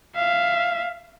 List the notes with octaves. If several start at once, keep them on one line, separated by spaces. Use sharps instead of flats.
E5 F5